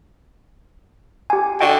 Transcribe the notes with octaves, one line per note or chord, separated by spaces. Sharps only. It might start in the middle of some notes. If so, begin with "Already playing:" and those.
G4 G#5
D3 F#4 D#5 G5